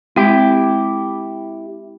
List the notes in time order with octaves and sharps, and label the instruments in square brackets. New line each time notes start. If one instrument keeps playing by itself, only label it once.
[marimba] G#3 C4 [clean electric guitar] E4 G4